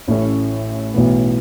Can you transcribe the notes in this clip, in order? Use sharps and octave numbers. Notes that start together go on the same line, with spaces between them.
A1 A2 A3 C#4 E4
B1 A2 E3 B3